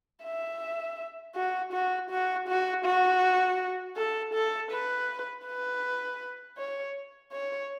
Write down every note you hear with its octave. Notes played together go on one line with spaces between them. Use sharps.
E5
F#4
F#4
F#4
F#4
F#4
A4
A4
B4
B4
C#5
C#5